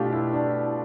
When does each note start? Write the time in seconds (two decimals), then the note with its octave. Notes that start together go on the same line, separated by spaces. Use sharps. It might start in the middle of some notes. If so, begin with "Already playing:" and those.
Already playing: B2 A3 D4 F4 G4
0.12 E4
0.33 D4